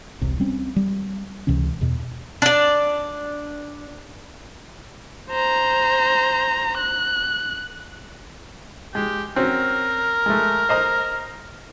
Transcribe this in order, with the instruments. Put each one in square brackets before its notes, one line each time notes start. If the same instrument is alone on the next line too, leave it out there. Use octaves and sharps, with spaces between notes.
[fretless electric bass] E1 C2 C3
G3 C4 C#4
G3
C#2 C3 E3 C#4
E2 B2
[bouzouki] D4 D5
[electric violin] C5 A#5
F#6
[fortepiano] G#3 [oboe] G4
[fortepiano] C4 C#4 F#4 [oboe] A#4
[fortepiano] G#3 A3
C5 D#5 A#5